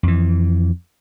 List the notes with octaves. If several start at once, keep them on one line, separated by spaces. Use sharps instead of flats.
F2 E3